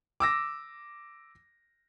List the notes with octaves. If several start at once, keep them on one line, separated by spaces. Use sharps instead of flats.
D6 E6 A#6